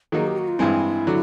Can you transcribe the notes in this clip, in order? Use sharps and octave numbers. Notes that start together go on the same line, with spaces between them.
D#3 F#3 A#3 D#4 G#4
G4
F#4
F4
G2 E3 G#3 C4 E4
D3 F#3